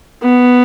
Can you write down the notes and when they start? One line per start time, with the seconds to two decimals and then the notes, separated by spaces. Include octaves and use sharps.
0.22 B3